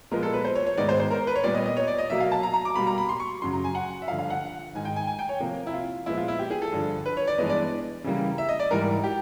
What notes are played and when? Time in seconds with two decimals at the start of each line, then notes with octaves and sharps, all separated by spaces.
0.11 A#2 F3 G#3 B3 A#4
0.23 A4
0.33 B4
0.45 C5
0.55 C#5
0.67 C#5
0.77 G#2 D#3 G#3 B3 D5
0.89 C5
1.00 C5
1.10 A#4
1.27 B4
1.35 C#5
1.44 A#2 G3 B3 D5
1.55 D#5
1.66 D#5
1.77 C#5
1.87 D5
1.98 D#5
2.10 B2 F#3 A#3 E5
2.20 F5
2.32 A5
2.43 A#5
2.54 A#5
2.65 D6
2.76 B2 G3 A#3 B5
2.87 A#5
2.98 B5
3.09 C6
3.20 C#6
3.42 F#2 C#3 F#3 C6
3.53 A#5
3.64 G#5
3.75 F#5
4.02 E5
4.08 G2 D3 F3 F5
4.19 F5
4.30 F#5
4.75 G#2 D#3 G#3 G#5
4.85 G5
4.96 G#5
5.07 G#5
5.19 G5
5.29 C#5
5.40 C3 F3 A#3
5.67 E4
5.73 F4
6.06 A#2 F3 G#3 B3 E4
6.17 F4
6.28 E4
6.39 G4
6.50 G#4
6.62 A4
6.72 G2 D3 F3
7.06 B4
7.17 C#5
7.27 D5
7.38 G2 E3 G#3 B3 D#5
7.50 D5
8.04 C#3 E3 G3 A#3
8.38 E5
8.49 D#5
8.60 D5
8.71 G#2 E3 G3 A#4
9.04 G4